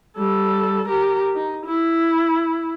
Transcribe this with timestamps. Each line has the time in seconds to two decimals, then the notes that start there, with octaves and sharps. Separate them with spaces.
0.17 G3 A4
0.88 G4 A#4
1.36 D#4
1.66 E4